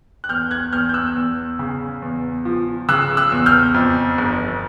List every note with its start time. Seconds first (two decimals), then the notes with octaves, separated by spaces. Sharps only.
0.24 F#6
0.29 E2 F6 G6
0.51 F#6 G#6
0.73 E2 F6 G6
0.89 G6
0.94 E6 F#6
1.16 E2
1.59 C#3
2.02 E2
2.45 F3
2.89 C#3 E6 F#6
3.17 E6 F#6
3.32 E2
3.46 F6 G6
3.74 F2
4.18 G1